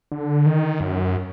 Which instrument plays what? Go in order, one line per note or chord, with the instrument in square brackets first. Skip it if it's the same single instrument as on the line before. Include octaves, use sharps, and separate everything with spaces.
[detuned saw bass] D3
D#3
F#2